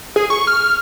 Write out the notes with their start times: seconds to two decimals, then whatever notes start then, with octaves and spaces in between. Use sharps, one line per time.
0.16 G#4
0.30 C#6
0.47 F6